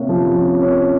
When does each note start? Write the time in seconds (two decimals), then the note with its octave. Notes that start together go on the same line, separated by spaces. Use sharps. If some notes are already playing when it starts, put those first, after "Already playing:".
Already playing: C3 A#3 C#4
0.09 F3
0.35 C#4
0.62 C#4